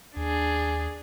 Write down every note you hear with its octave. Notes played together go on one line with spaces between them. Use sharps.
D#2 D4 G#4